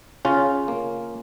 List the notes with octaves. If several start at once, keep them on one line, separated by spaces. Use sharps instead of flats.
C#3 C#4 F4
A#3